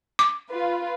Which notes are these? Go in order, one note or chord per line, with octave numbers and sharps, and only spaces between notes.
D6
F4 B4